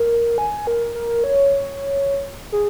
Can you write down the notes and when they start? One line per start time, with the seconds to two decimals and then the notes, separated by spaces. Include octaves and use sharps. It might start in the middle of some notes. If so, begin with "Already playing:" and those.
Already playing: A#4
0.38 G#5
0.67 A#4
0.95 A#4
1.24 C#5
2.52 G#4